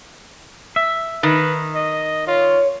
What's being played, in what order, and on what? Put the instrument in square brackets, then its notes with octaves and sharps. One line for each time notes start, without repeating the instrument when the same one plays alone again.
[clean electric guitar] E5
[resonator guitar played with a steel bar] D#3 [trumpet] B4
[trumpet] D#5
[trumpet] F4 [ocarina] C#5